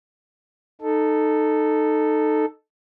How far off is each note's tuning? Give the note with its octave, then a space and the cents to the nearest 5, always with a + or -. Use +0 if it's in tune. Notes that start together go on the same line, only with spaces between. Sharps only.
D#4 -15 A4 +0